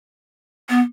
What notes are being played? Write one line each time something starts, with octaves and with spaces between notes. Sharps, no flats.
B3